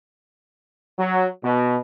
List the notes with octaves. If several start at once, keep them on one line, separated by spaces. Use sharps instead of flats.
F#3
B2